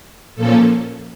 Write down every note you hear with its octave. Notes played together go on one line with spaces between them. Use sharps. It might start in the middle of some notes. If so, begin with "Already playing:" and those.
A#2 F3 A#3 C#4 A4